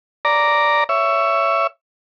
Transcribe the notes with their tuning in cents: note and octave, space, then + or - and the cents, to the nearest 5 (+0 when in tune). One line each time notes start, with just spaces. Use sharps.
D5 -5 A#5 +0
C#5 +10 E5 +15